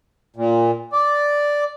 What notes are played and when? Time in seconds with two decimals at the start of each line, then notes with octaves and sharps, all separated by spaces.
0.36 A#2
0.92 D5